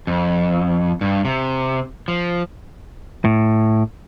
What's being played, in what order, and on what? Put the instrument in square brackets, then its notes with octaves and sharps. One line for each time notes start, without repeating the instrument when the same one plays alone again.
[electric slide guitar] F2
G2
C3
F3
[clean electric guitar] A2